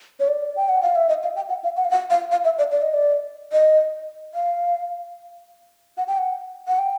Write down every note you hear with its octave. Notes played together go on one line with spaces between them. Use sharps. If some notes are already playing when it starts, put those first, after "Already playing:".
C#5
D5
G5
F#5
F5
E5
D#5
F5
G5
F#5
F5
F#5
F5
F#5
F5
F5
E5
D5
D5
D#5
D5
D#5
F5
F#5
G5
F#5
F#5
G5